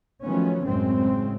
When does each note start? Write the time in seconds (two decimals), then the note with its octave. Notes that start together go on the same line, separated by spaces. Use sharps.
0.24 D#3 F3 F#3 A3 B3 C#4
0.64 A1 F#2 A2 C#3 G#3 C4